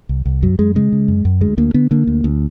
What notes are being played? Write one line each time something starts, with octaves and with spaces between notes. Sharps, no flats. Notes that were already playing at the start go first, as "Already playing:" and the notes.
C2
C2
F#2 F#3
F#2 G#3
C#3 G#3
C#3
F#2
F#2
D2 G#3
D2 A#3
D3 B3
D3 A#3
D2
D2